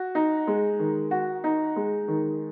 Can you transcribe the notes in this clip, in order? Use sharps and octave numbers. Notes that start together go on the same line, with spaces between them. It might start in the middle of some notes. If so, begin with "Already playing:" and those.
Already playing: F#4
D#4
G#3
D#3
F#4
D#4
G#3
D#3